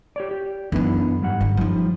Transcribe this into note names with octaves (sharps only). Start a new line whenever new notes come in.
G4 C#5 D5
G4
F#2 D3 E3 B3 D#4
G#2 G3 F#5
G1
F#2 F3 G3 D#4